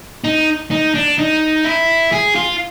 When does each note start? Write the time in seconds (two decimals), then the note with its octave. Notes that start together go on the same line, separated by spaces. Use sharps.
0.24 D#4
0.71 D#4
0.95 D4
1.18 D#4
1.65 E4
2.12 G#4
2.35 F4